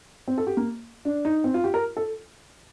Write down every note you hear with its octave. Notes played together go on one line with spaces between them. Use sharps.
C4
A4
G4
A#3
D4
D#4
C4
F4
G4
A#4
A4